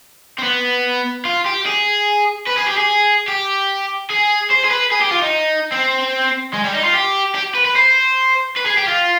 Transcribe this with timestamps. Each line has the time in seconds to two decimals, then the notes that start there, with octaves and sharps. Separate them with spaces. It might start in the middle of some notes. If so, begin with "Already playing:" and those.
0.39 C4
0.43 B3
1.25 F4
1.46 G4
1.66 G#4
2.47 B4
2.57 G#4
2.67 G4
2.77 G#4
3.28 G4
4.10 G#4
4.50 C5
4.64 G#4
4.70 B4
4.92 G#4
5.01 G4
5.11 F4
5.22 D#4
5.72 C4
6.54 G#3
6.64 G3
6.74 D#4
6.84 F4
6.94 G4
7.35 G4
7.55 B4
7.65 B4
7.76 C5
8.57 B4
8.66 G#4
8.78 G4
8.88 F4